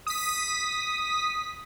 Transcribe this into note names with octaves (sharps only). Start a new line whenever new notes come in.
D#6 B6